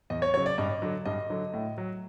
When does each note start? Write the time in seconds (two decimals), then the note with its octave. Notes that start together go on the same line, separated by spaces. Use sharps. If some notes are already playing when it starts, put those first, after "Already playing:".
0.10 E2 D#5
0.22 C#5
0.34 C#3 F#3 C#5
0.46 D5
0.58 G2 D#5
0.82 D3 F#3
1.05 G2 D#5
1.30 D3 F#3
1.54 A2
1.78 F#3